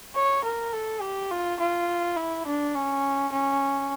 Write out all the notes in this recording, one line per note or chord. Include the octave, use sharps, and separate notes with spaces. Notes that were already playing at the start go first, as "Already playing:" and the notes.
C#5
A#4
A4
G4
F4
F4
E4
D4
C#4
C#4